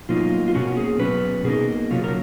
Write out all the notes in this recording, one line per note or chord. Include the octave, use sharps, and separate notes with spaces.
B2 F#3 A#3 D#4 F4
F4
B2 A#3 C#4 F#4
G#4
B2 F#3 C#4 B4
B2 A#3 D#4 G#4
C#3 F#3 A#3 C#4 F4
A#4